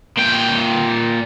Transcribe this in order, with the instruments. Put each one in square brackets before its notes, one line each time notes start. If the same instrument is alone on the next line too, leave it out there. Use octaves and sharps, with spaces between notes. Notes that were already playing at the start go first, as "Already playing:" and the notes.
[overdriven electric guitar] A#2 G5